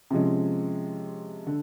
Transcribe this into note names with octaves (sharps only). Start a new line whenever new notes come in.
C3 F3 G#3 C#4
D3